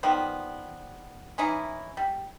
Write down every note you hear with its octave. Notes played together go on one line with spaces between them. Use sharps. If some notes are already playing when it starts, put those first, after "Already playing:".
D#3 F3 G3 B3
E3 C#4 D#4 E4
G3